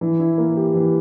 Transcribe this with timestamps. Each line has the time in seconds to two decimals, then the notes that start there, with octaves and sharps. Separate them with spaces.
0.01 E3
0.20 E4
0.38 A#3
0.56 G4
0.74 E3